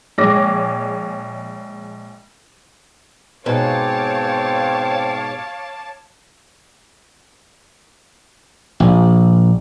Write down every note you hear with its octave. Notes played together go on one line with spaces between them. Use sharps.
A#1 G#3 C#5 D6 A#6
G#2 B2 C4 C#5 F5 A5 D6
A#1